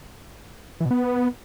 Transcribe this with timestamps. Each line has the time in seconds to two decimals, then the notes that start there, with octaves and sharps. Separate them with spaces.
0.80 E3
0.86 B2
0.91 B3